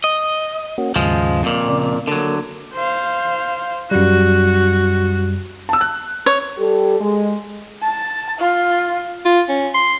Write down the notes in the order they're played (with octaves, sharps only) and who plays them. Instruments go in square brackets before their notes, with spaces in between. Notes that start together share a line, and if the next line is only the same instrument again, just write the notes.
[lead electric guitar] D#5
[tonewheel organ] A#3 C#4 F#4
[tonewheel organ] D#2 G#2 C#3 [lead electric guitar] F3 G#3
[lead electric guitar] F2 A#2
[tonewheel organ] C#3 D5
[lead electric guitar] D3 F#3 [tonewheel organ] A#3
[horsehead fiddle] C5 F5
[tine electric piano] F#2 G3 [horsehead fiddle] F#4
[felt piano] A5 E6
F#6
[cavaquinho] C#5
[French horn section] G3 G4 A4
G#3
[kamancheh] A5
F4
[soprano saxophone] F4
C#4
C6